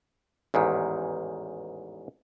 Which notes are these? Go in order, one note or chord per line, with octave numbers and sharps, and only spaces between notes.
A1 E2 G#2 D#3